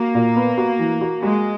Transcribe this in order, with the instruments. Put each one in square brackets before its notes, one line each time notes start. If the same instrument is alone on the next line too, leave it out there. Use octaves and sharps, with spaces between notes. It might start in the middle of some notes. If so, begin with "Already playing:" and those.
Already playing: [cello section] A#3 [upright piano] F#4
[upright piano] A#2
B3
F#4
E3
F#4
[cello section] G#3 [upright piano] F#4